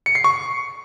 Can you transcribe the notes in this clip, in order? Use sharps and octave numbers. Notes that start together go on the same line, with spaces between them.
C#7
C7
C#6